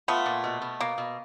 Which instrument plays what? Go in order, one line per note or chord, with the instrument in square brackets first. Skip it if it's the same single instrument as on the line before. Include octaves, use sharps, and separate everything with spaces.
[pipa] A3 B3 [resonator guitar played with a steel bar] F4
[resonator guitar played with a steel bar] A#2
B2
B2
[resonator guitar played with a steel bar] B2 [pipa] A#3
[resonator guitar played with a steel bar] B2